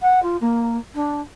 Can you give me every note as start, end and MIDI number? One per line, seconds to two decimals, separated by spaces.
0.01 0.22 78
0.22 0.36 65
0.41 0.77 58
0.94 1.20 62